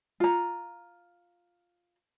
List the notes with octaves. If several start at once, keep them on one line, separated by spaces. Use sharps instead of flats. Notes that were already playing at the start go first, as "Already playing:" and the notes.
F4 A#5